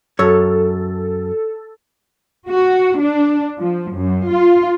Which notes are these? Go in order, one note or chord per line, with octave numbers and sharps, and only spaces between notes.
F#2 A4 C#5
F#4
D4
F3
F#2
F4